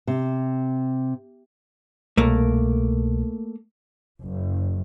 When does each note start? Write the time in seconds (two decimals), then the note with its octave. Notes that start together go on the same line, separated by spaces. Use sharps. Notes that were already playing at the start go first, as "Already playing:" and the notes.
0.07 C3
2.17 C2 B2 A3 A#3
4.22 F#1